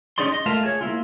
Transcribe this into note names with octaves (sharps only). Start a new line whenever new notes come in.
C#4 D#4 G#4 D5 C6
D#5 C6
A3 F4 A#4 F5 A5
G#4 C#5
A#3 C4 E4 F4